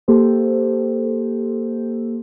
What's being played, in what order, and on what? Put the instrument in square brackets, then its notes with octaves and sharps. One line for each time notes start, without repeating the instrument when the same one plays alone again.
[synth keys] A#3 G4 A4 C5